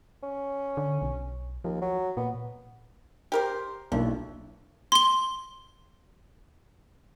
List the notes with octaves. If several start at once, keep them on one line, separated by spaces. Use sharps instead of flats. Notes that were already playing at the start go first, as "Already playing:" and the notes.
C#4
D3
B1
D#2 F3
F#3
A#2 B3
G4 A#4 C5
B1 F3 A#3 D4 E4
C6 G7